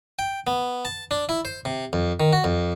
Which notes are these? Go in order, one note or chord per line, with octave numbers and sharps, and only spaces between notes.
G5
B3
A5
D4
E4
C5
C3
F2
D#3
F#4
F2